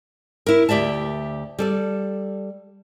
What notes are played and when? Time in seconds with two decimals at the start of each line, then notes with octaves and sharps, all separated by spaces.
0.46 E4 A#4
0.69 D2 G4 D5 E5 A5
1.59 G3 A4 D5